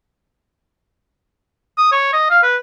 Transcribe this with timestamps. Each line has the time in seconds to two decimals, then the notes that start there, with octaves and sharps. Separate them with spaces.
1.78 D#6
1.92 C#5
2.13 D#5
2.30 F5
2.43 B4